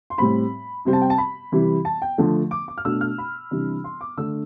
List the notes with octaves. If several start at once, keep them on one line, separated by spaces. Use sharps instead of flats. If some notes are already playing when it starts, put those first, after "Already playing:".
C6
A2 G3 C4 B5
C3 G3 C4
A5
G5
A5
B5
C3 E3 G3
A5
G5
D3 F3 A3 D4
D6
D6
F6
B2 A3 D4 E6
F6
B5
C3 E3 G3 D4
C6
D6
D3 A3 D4 E6